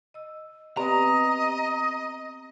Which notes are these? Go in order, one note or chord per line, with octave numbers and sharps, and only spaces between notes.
D#5 E6
B3 C4 G4 B4 D5 D#5 A#5